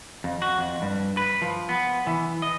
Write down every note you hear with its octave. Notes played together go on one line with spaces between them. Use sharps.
F2
F#4
F2
G2
B4
F3
B3
E3
D#5